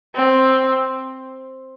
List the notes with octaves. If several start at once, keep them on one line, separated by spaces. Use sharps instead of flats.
C4